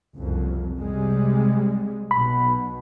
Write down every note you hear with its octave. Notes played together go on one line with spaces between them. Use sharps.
F#1 C2 F2
C3 G3 G#3
B1 B2 B5